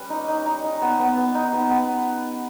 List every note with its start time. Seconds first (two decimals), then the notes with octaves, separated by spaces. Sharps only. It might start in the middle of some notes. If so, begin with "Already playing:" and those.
Already playing: G3 C#4 B4
0.10 D#4
0.28 D#4
0.46 D#4
0.64 D#4
0.82 B3
0.99 B3
1.17 B3
1.35 D#4
1.53 B3
1.70 B3